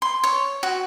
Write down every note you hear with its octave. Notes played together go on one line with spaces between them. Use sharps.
C6
C#5
F#4